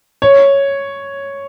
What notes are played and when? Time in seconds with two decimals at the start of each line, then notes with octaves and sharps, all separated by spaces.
0.22 C#5